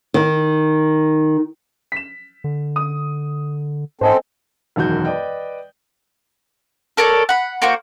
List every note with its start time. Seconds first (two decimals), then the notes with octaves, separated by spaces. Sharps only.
0.14 D#3
1.92 B6 E7
2.44 D3
2.76 D#6
4.01 G#2 C4 A4 C5 D#5 G#5
4.76 E1 F#2 D#3 F#4 G6
5.05 B4 D5 D#5 G5
6.97 A4 A#4 C#5 D5
7.29 F#5 B5
7.62 A#3 F#4 C5